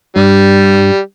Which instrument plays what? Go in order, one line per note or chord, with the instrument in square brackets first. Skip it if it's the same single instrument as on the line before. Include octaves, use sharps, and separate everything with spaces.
[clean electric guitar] G2 [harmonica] G3